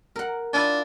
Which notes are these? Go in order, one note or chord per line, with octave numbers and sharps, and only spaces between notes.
A#4 F#5
D4 E4 F4 G#5